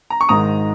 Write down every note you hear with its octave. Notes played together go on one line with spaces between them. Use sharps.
A#5
C#6
G#1 G#2 D#3 G#3 A#5 D#6